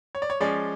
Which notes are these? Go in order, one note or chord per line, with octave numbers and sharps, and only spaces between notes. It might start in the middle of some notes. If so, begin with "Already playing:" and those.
C#5
D5
C#5
F3 G#3 C#4 D5